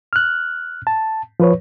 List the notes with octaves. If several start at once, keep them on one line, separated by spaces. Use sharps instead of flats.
F6 F#6
A5
F3 B4 C#5